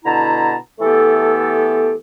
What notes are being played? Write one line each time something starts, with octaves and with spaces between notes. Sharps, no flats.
B2 D3 E4 A5 A#5
E3 A3 B3 G4 A4